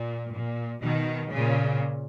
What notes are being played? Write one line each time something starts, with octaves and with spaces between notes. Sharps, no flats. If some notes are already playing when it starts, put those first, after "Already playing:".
Already playing: A#2
A#2
B2 D#3
A#2 C#3